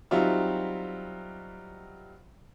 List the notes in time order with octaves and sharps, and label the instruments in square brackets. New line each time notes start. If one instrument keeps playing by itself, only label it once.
[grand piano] F#3 G3 C4 D#4 F4 E5